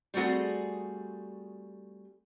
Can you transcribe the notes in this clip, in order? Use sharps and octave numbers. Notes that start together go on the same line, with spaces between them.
G3 A3 C4 F#4 G#4